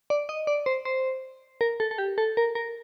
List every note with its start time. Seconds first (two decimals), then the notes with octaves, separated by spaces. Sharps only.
0.10 D5
0.29 D#5
0.47 D5
0.66 C5
0.85 C5
1.61 A#4
1.80 A4
1.91 A4
1.98 G4
2.18 A4
2.37 A#4
2.55 A#4